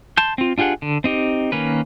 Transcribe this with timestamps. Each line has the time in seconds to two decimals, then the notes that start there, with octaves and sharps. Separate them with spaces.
0.17 A5 C6 G6
0.38 C4 F4
0.58 D4 F4 G4 G#4 F#5
0.82 D3
1.04 C4 D#4 G4
1.52 D#3 A#3 C#4 B4